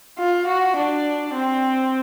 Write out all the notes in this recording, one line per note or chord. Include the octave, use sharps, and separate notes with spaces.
F4
F#4
D4
C4